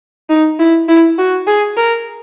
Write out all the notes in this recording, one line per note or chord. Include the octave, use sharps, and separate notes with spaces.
D#4
E4
E4
F#4
G#4
A#4